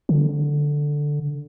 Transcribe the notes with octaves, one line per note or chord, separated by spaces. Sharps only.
D3